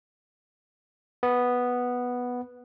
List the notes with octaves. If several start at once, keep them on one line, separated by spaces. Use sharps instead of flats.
B3